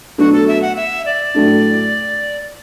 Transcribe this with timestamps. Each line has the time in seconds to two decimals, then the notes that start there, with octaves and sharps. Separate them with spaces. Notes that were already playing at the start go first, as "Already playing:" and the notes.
0.18 B2 F#3 A3 D4 F#4
0.33 A4
0.48 E5
0.62 F#5
0.76 E5
1.06 D5
1.35 A2 F#3 A3 D4